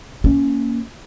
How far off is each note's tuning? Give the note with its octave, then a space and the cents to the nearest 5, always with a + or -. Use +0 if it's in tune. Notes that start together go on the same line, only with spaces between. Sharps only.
A#3 +0 C#4 +10